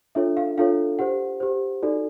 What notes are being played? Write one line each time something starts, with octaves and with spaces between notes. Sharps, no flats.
D4 F4 A4 C#5 E5
F5
D4 F4 A4 C#5 F5
G4 C5 F#5
G4 C5
D#4 F#4 A4 D5